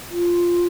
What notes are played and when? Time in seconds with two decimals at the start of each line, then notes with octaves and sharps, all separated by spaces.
0.10 F4